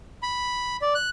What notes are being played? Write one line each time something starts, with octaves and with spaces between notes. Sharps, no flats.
B5
D5
F#6